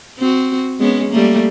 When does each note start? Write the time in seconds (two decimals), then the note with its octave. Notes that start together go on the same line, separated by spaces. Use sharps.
0.19 C4 F#4
0.80 G#3 B3 C#4
1.11 G3 A3 A#3